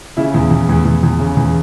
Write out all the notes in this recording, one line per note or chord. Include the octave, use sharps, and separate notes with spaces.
C#3 E4
E2
E2
E2
E2
E2
C#3
E2